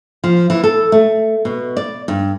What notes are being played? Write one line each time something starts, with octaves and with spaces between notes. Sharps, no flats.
F3
E3
A4
A3
B2
D5
G2